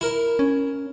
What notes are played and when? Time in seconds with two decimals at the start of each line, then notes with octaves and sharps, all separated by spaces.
0.01 E4 A#4
0.39 C#4